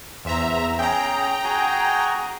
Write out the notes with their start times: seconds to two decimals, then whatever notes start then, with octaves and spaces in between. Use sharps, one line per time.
0.25 E2 C5 E5 A#5
0.79 C#4 G#4 G5 A#5
1.44 F#4 G#4 G#5